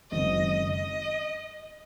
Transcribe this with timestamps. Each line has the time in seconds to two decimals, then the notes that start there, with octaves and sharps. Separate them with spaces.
0.11 F#1 F#2 D#3 G#3 C4 D#5
0.74 D#5